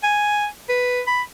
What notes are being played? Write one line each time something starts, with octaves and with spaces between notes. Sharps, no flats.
G#5
B4
B5